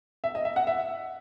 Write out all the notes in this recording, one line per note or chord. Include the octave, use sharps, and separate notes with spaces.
E5
D#5
E5
F#5
E5